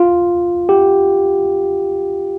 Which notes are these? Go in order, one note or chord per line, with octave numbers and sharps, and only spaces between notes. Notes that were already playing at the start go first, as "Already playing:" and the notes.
Already playing: F4
G4